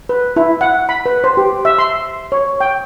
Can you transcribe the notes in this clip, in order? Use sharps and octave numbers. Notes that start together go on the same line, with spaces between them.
B4
E4
F#5
B5
B4
C5
G4
E5
C6
C#5
G5